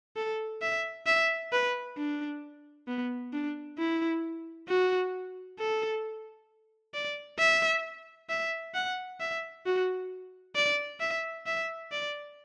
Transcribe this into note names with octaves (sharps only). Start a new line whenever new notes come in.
A4
E5
E5
B4
D4
B3
D4
E4
F#4
A4
D5
E5
E5
F#5
E5
F#4
D5
E5
E5
D5